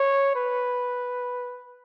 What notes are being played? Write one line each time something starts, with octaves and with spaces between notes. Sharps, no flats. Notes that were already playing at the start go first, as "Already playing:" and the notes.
Already playing: C#5
B4